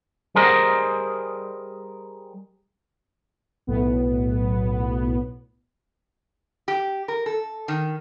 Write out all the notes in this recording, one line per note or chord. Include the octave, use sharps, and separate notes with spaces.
G3 G#4 A#4 C5 D#5
B1 A2 B3
G4
A#4
A4
D#3